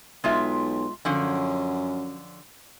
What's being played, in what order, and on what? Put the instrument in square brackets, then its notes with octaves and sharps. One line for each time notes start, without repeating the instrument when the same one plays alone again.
[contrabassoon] B1 [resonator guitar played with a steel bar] G#3 F4 E5
[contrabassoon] F#2 [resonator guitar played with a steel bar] D3 F3 C#4